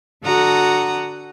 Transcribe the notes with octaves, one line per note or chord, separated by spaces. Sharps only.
D3 F#4 A4 F#5 A#5 D#6